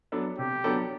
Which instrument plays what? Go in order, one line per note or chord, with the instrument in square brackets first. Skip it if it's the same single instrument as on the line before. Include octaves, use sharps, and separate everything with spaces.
[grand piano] F#3 B3 D4 A4
[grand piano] C3 [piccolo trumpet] G4
[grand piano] F#3 B3 D4 A4